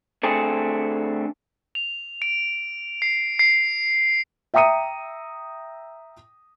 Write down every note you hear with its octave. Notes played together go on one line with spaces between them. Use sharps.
D3 A3 C4 G#4
F7
D7
C7
C7
E5 G5 A#5 D#6 C#7 D#7